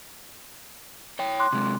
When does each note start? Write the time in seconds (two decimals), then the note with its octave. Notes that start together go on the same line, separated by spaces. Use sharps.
1.19 C#5 G5
1.39 C6 D6 F#6
1.53 C3 G#3